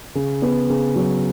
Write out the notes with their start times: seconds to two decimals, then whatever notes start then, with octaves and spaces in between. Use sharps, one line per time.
0.15 C#3
0.42 B3
0.70 C#3
0.96 F#3